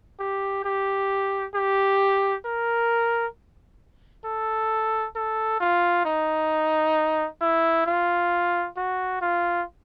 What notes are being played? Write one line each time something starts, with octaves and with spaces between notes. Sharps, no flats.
G4
G4
G4
A#4
A4
A4
F4
D#4
E4
F4
F#4
F4